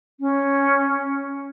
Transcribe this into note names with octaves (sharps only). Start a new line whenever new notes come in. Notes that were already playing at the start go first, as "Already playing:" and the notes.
C#4